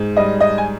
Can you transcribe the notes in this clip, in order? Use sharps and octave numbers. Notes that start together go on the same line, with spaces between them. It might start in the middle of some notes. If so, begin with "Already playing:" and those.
Already playing: G#2
G3 D#5
D#5
G#5